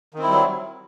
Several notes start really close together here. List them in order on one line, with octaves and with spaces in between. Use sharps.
D#3 C4 E4 G3 F#3